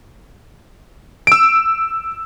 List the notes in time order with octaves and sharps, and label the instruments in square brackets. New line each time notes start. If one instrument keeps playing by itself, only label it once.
[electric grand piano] E6 D7